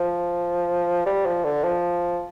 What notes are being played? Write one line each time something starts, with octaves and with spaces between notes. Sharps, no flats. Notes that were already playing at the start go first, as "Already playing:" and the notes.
Already playing: F3
G3
F3
D3
F3